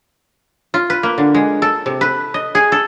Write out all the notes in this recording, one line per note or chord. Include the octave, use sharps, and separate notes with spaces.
F4
B4
A#3
D3
G#3
A4
C3
B4
D#5
G#4
A4